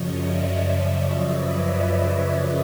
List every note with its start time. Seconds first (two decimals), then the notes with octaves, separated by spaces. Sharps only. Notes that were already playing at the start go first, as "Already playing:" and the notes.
Already playing: F#2 C#3 F3 C#5 D#5
0.24 D5 E5
0.59 C#5 D#5
1.30 B4 C#5